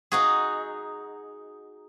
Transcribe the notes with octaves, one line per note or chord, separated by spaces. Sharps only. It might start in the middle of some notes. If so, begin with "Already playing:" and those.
D#4 F#4 G#4